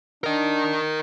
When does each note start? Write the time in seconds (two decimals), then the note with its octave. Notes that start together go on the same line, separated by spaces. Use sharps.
0.24 D4 A#4 D#5